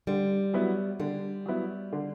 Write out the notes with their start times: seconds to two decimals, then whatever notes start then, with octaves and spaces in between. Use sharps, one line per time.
0.07 D3 G3
0.53 F#3 B3 E4
1.00 D3 G3
1.46 F#3 B3 E4
1.92 D3